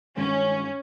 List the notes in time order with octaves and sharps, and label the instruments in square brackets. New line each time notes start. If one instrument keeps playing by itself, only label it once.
[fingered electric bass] G2 D#3 G#3 [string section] C#4